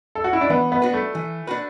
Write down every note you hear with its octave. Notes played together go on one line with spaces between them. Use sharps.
A4
F#4
E4
D4
E3 B3
B3
D4 F#4 B4
A3
E3
D4 F#4 B4